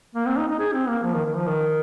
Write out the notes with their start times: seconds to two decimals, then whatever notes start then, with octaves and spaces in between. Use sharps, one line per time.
0.15 A#3
0.26 C4
0.37 D#4
0.48 D#4
0.59 G#4
0.74 C4
0.88 A#3
1.03 F3
1.14 D#3
1.25 D#3
1.36 F3
1.47 D#3